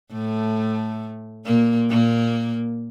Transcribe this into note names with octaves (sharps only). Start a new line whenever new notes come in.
A2 A3
A#2 A#3
A#2 A#3